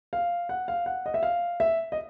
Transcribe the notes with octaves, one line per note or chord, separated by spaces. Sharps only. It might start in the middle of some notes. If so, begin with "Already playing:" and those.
F5
F#5
F5
F#5
D#5
E5
F5
E5
D#5